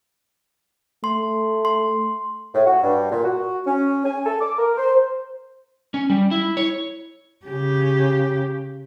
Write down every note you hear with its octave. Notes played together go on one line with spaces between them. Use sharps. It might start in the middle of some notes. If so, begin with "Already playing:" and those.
A3 C6
C6
A2
F#4
G2
A#2
F#4
C#4
G#5
A4
D6
A#4
C5
C#4
G3
E4
C#5
C#3 G4